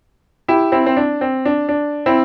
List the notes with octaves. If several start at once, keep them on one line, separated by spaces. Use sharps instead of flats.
E4 G4
C4 E4
C4
D4
C4
D4
D4
C4 E4